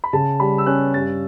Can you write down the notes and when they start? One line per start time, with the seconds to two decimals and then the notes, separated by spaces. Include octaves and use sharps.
0.04 B5
0.13 C#3 A5
0.40 G3 B5
0.58 E6
0.66 C#4 F#6
0.94 G2 A6